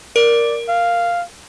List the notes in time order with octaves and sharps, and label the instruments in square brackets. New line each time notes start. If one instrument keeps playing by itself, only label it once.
[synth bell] A#4 [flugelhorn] D5
[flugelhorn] F5